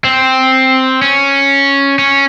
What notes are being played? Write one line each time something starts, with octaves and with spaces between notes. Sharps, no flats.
C4
C#4
C#4